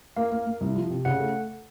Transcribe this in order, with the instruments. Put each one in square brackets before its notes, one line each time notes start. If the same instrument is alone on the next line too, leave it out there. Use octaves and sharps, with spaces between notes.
[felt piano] A#3 [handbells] F5
[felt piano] A#3
A#3
C2
F3
C3
[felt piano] C#3 [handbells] F#5
[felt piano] A3